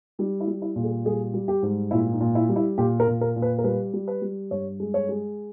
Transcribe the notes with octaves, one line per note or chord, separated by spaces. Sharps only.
G3 D#4
E4
G3
E4
A#2
G#4
G3 G#4
G3
G4
G#2
A#2 E4
D#4
A#2
E4
G3
E4
A#2 G4
A#4
A#2
A#4
A#2
B4
A#4
G3 B4
G3
B4
G3
G2 C#5
G#3
C#5
G#3